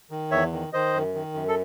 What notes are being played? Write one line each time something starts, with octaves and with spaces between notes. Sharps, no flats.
D#3
E2 C#5 E5
D#3
D#3 C5 D#5
F#2
D#3
F#2
A4